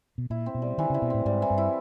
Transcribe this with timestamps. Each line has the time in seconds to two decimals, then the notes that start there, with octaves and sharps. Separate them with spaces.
0.18 B2
0.30 A#2 E4
0.46 C4
0.55 B2
0.62 G3
0.78 D#3 E3
0.90 C#3
0.94 E4
1.02 B2
1.10 A2 C4
1.25 G#2 G3
1.42 E3
1.50 G2
1.58 E4